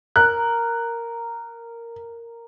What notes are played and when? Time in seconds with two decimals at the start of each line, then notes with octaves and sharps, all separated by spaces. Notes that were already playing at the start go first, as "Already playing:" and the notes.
0.16 A#4 F#6